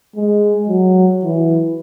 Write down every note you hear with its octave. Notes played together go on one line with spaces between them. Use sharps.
G#3
F#3
E3